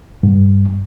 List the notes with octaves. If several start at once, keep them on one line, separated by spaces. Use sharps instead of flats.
G2